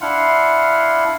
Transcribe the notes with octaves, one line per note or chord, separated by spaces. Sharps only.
D4 E4 F5 F#5 C6